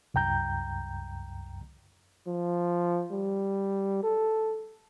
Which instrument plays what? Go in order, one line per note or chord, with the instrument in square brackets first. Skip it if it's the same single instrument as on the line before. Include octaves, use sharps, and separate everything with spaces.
[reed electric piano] C2 F#2 G5 A#5 G6
[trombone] F3
G3
A4